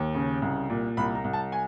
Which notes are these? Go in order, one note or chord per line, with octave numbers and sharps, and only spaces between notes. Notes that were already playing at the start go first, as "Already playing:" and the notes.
Already playing: D#2
C#3
C2
A#2
C2 B5
A#5
C2
A5
G#5